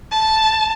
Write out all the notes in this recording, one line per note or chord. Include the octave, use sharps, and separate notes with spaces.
A5